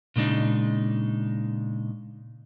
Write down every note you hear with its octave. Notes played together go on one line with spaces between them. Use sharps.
A#2 C#3 G#3 D4 D#4